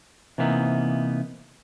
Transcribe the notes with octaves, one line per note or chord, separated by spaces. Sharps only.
C3 E3 A#3 B3 D#4